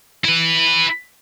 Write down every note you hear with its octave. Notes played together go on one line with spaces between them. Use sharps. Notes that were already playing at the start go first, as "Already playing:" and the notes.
E4 B4